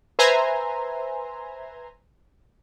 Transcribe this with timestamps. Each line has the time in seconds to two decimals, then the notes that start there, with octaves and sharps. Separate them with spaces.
0.19 B4 C5 E5 G#5 A#5 C6